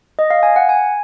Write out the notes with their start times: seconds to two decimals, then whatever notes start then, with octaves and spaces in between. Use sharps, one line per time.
0.19 D#5
0.31 F5
0.43 G#5
0.56 F#5
0.69 G#5